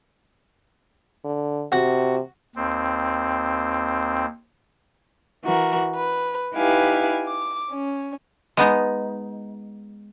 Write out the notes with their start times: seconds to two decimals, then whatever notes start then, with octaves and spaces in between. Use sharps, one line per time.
1.24 D3
1.72 C3 F#4
2.56 D#2 C4
5.43 E3 F#4 A#4
5.95 B4
6.54 D#4 E4 G4 B4 F5 G#5
7.26 D6
7.70 C#4
8.57 G#3 B3 D#4